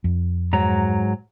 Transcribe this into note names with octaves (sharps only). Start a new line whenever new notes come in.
F2
G#2 F#3 A#5